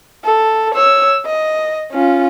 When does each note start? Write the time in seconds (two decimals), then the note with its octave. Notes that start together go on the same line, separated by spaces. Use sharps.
0.24 A4
0.75 C#5 E6
1.26 D#5
1.92 C#4 F4